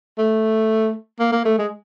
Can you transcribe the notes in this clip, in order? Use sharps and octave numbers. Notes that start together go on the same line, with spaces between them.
A3
A#3
A#3
A3
G#3